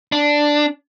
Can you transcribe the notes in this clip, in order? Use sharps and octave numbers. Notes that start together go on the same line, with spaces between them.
D4